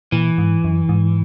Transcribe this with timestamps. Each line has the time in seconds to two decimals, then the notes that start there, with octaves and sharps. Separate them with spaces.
0.12 A#2 E3
0.38 G#2
0.64 F#2
0.89 G#2